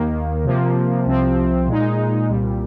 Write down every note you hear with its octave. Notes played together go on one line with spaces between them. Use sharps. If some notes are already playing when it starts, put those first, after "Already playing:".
Already playing: D#2 D#3 A#3
C3 F3 A#3
C2 C3 F3 C4
A#2 G#3 D#4
C2 A#2 G3